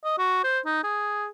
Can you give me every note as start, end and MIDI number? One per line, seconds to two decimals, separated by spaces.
0.04 0.14 75
0.18 0.41 66
0.44 0.59 72
0.66 0.83 63
0.84 1.26 68